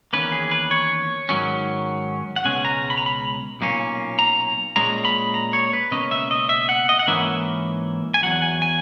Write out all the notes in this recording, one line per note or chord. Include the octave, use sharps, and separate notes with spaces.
E2 D#3 A#3 C#4 B4
G#4
B4
C#5
G#2 D#3 F#3 C#4
F#5
C#2 B2 G#3 C#4 G#5
A#5
B5
A#5
B5
B1 A#2 A#3 C#4
A#5
A#2 G#3 C#4 A#5
B5
A#5
C#5
B4
C#2 B2 A#3 C#4 D#5
E5
D#5
E5
F#5
D#5
F#5
G#2 E3 A#3 C#4 E5
G#5
E2 B2 F#3 F#5
G#5
G#5